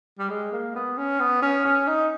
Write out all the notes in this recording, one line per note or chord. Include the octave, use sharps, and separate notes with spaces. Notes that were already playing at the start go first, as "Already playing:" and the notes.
G3
G#3
A#3
B3
C#4
B3
C#4
C#4
D#4